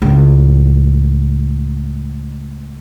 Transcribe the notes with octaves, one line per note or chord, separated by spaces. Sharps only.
C#2 A2